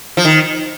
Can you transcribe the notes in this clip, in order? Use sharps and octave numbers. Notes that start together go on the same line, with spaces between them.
F3
D#3